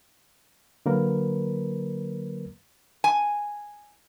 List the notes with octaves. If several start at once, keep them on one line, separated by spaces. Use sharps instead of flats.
D3 F#3 A#3 A#4 B4
G#5